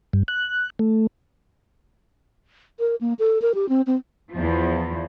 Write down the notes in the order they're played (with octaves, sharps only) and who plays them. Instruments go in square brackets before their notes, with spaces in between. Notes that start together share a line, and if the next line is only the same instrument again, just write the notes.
[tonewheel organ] G2
F#6
A3
[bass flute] A#4
A#3
A4
A#4
G4
C4
C4
[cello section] E2 F3